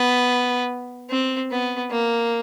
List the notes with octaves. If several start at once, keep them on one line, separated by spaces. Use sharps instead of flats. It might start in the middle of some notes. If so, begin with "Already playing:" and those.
Already playing: B3
C4
B3
A#3